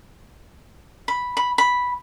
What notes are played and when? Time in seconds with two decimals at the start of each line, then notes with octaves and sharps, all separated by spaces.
1.08 B5
1.37 B5
1.58 B5